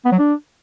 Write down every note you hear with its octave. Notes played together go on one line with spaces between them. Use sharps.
B3
F#3
D4